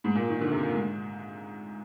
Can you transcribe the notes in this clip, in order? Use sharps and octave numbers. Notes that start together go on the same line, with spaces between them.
G#2
A#2
D#3
D3
C3
A#2
G#2